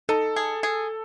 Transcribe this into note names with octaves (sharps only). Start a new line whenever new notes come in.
D#4 A4
G#4
G#4